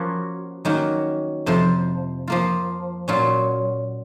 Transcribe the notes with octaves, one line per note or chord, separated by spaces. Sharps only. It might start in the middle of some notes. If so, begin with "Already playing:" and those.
Already playing: F3 A#3 C#4 F#4
D#3 F#3 A#3 C#4 F#4
F2 C3 F3
F3 A#3 F4
A#2 F#3 C#4 F4